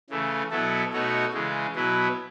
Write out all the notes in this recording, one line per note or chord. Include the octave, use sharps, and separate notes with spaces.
C#3 E3 A3
B2 F#3 B3 E4 A4
B2 A3 D#4 F#4 C#5
C#3 E3 G#3
B2 F#3 B3 E4